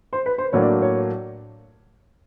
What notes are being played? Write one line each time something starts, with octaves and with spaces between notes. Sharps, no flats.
C5
B4
C5
A2 F#3 A#3 D4 C#5
D5
C#5